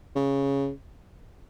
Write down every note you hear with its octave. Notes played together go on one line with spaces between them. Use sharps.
C#3